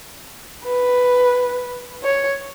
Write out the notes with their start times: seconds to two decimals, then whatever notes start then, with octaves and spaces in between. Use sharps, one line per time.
0.65 B4
2.03 C#5